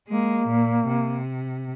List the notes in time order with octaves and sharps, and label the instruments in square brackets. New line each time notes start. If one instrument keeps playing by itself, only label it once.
[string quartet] G#3 [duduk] A#3
[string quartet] A#2
C3